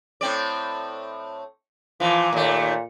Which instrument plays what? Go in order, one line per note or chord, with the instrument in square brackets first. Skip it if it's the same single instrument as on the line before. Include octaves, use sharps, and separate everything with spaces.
[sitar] A2 C4 D5
[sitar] A#2 E3 [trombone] F3
[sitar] D#2 A3 [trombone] A#2